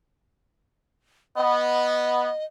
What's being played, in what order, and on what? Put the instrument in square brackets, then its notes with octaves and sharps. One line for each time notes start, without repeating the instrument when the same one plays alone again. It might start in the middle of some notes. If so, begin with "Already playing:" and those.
[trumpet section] B3 [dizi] D#5